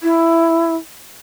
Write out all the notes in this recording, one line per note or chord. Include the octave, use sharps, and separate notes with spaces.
E4